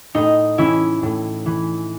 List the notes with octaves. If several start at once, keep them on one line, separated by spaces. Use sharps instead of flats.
A2 D#4
E3 C#4 E4
A2
E3